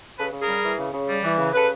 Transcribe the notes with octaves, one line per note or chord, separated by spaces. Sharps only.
C#3 A4 B4
C#3
G#4 A#4
G3
E3
C#3
C#3
G3
E3
C#3
C#3 A4 B4